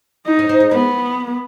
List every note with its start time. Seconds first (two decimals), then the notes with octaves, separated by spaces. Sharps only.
0.27 D#4
0.39 C#4
0.49 C4
0.60 G#3
0.71 G#3 B3